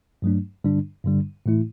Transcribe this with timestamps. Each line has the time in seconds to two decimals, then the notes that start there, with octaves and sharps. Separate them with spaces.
0.22 G2 F#3 A3 D4
0.64 G2 D3 G3 D4
1.04 G2 D3 G3 D4
1.46 A2 E3 A3 E4